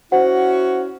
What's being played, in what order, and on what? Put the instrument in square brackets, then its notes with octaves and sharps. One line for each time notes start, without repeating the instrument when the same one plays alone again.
[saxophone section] C#4 E4 F#4 [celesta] C5 F#5